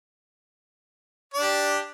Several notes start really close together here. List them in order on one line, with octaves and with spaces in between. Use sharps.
D5 D4 G4